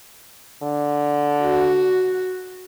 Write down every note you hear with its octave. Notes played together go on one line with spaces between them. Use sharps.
D3
F#4